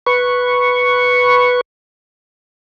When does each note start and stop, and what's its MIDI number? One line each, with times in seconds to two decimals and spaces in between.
0.07 1.61 71
0.07 1.61 85